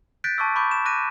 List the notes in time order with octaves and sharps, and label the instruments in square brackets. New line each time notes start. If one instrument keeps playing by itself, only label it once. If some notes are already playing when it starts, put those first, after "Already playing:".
[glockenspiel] F#6 G6 A6 B6 D7
A5 C#6 D6 E6
B5 C#6 D6 G6
E7
D6 F#6 A#6 D#7